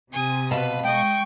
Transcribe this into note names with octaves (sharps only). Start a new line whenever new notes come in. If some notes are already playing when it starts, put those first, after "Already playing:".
C3 G#5 D#6
B2 B4 F5 A5 B5
G#3 D#5 G5 C#6